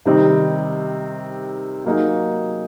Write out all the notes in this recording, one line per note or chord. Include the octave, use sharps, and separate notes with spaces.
C3 D#3 G3 C4 D#4
F#3 A#3 D#4 G#4